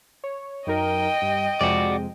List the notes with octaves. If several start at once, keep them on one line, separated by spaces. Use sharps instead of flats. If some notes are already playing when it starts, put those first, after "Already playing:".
C#5
F#2 D#4 A#4 D#5 G5
G2
F2 C3 G#3 F#4 D5